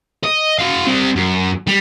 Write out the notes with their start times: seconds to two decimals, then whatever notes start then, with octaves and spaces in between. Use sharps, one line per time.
0.24 D#5
0.59 F#4 F5
0.87 G3 C4
1.16 F#2
1.67 G3